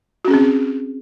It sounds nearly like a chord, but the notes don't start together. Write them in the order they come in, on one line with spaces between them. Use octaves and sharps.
F#4 C#4 G#4 C4